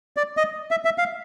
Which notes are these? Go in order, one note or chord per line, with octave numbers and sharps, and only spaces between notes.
D5
D#5
E5
E5
F5